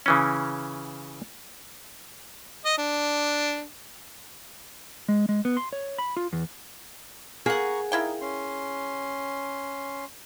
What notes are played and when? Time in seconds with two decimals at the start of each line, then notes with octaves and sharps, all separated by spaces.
0.06 C#3 E3 C#4
2.65 D#5
2.78 D4
5.08 G#3
5.29 G#3
5.45 B3
5.57 C6
5.73 C#5
5.99 B5
6.17 F4
6.33 E2
7.46 A#3 G#4 F#5 A#5 C#6
7.92 A#3 D#4 E4 G5
8.21 C#4 C6